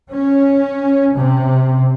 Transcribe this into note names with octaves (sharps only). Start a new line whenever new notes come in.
C#4
C3